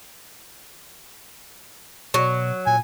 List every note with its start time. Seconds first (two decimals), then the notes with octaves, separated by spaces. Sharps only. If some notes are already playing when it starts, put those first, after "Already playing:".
2.14 B2 F#3
2.67 A#2 G#5